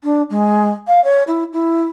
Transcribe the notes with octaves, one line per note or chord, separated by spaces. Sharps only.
D4
G#3
F5
C#5
E4
E4